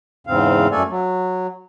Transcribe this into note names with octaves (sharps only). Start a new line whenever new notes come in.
E2 G#2 C#3 C4 F5
F#2 A3 A4 D5 G#5
F#3